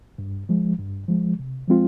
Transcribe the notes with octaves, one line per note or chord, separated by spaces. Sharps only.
G2
F3 G#3
G2
F3 G#3
C3
F3 G#3 C4 F4